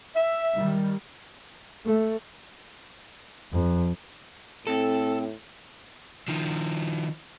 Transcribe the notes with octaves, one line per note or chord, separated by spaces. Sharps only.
E5
D#3 G3
A3
F2
A2 C4 A4
D#3 F3